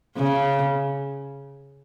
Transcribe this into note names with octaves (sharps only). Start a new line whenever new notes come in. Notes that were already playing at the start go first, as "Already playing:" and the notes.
C#3